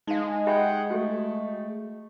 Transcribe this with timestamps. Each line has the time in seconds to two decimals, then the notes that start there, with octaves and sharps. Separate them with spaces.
0.07 G#3 D#4 F5
0.47 G4 G#4 E5 F#5 G5 B5
0.90 A3 F#4 G4 A4